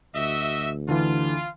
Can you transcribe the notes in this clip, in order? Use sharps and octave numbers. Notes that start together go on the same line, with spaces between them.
D2 F#4 D#5 E5
D3 E3 F4